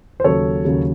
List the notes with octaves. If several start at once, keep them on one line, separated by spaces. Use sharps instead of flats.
C5
D#2 C#3 F#3 A4 C#5
D#2 C#3 F#3